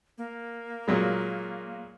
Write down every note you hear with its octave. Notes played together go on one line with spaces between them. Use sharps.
A#3
A#2 F#3 G#3